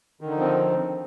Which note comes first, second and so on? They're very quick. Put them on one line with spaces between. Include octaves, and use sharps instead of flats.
D#3 D3 D#4 F3 C4